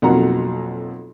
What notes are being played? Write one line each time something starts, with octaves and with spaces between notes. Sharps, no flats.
B1 F2 F#3 A#3 F#5 A#5